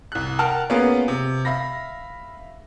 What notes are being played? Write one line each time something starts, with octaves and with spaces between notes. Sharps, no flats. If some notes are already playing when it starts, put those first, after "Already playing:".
C2 F#6
A#4 F#5 G5 A5 F6
A#3 B3 C#4 F4 G#4 A#4
C3
E5 F5 B5 A#6